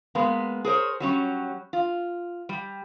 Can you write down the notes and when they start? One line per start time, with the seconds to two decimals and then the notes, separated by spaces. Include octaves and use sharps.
0.15 G#3 A#3 B3
0.65 G#4 A#4 C5 C#5
1.00 F#3 G3 C#4
1.73 F4
2.49 G3